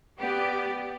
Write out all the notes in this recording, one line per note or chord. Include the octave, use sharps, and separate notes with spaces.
B3 G4 D5